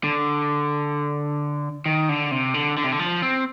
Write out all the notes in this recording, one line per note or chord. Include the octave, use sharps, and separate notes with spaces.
D3
D#3
D3
C3
D3
D3
C3
D3
F3
C4